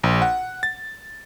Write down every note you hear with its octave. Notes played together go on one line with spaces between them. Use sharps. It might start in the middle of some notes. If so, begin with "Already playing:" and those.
A#1
F#5
A6